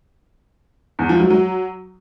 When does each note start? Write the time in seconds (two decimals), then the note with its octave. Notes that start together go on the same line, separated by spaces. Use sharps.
0.99 E2
1.09 F3
1.20 F#3
1.30 F#3